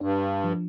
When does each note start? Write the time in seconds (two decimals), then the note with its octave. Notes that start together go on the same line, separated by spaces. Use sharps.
0.01 G2 D4
0.44 F3